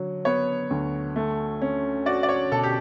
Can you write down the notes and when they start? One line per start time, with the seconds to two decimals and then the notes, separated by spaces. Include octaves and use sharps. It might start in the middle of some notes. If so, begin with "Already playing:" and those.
Already playing: D3 F#3
0.25 B3 C#5
0.70 D2
1.16 A3
1.62 C#4
2.06 F#4 D5
2.23 D5
2.29 C#5
2.52 B2 A4
2.64 G4